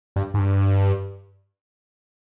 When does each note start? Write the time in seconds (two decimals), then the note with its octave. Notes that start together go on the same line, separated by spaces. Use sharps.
0.16 G2
0.34 G#2
0.39 G2